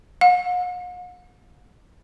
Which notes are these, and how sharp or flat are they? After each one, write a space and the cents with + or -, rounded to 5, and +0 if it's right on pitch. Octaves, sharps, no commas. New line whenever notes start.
F#5 -45